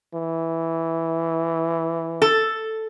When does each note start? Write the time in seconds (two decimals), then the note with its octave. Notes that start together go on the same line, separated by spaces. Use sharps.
0.15 E3
2.22 A4